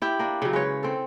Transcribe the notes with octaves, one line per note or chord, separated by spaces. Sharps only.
E4 G4
A#3 D4
C#3 F#3
G#3 B4 C#5
C4 A4